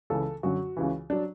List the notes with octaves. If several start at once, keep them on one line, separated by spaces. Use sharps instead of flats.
C#2 C#3 E3 A4
F#2 D3 F#3 F#4
C#2 C#3 E3
F#3 D4